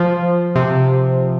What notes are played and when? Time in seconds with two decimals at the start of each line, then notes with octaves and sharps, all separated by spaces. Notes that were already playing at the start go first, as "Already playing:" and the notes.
Already playing: F3
0.55 C3